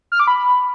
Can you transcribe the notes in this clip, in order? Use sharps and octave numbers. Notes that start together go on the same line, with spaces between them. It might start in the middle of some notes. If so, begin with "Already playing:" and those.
F6
D6
B5